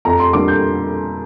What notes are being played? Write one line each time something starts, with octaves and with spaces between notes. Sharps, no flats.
F2 A#5
C6
D3 G3 A#3 D6
G6